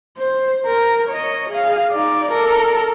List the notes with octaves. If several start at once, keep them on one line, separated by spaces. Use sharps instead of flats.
C5
A#4
C#5 D#5
G#4 F5
D#4 D5
A4 A#4